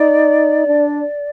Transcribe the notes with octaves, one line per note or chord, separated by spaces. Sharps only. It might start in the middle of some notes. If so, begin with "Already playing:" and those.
Already playing: D#4 D5
D4